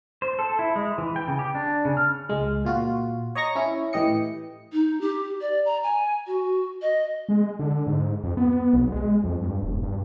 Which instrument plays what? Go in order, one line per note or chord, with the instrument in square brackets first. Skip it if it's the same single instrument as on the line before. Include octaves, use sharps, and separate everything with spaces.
[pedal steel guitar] C5
A4
E4
G#3
E3
G5
C#3
G4
D4
C#3
F6
[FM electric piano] C#2 G#3
A#2 F4 F#4
C#5 D#5 A#5 C#6 A#6
C#4 E4
A2 E3 G4 D#5 C#7
[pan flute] D#4
G4
D5
A#5
G#5
F#4
D#5
[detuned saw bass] G#3
D3
G#2
F2
B3
B1
G#3
F2
G2
E1
G2